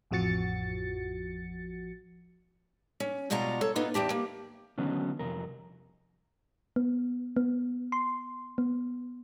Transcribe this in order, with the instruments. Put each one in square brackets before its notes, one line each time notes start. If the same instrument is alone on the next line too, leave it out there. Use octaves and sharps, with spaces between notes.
[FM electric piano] A1 F2 F3 F#4 A6 C#7
[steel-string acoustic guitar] C#4
G#2 B2 G3 F4 F#4 A#5
A4 C#5
A#3 B3 D#4 F4 B4
E2 C4 G4 A5
A#3
[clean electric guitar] D3 D#3 F#3 B3 C#4
C2 F2 A#4
[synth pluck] B3
B3
C6
B3